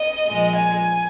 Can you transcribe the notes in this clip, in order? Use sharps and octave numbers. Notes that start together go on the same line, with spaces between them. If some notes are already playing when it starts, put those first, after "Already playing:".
Already playing: D#5
A#2 F3 G#3
G#5